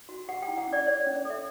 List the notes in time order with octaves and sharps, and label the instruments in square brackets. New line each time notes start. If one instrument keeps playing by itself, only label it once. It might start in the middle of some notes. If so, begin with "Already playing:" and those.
[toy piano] F#4
G4 F#5
G5
E4
F#5
C#4
D5
C#5 D5
C#4
D5
A4
E5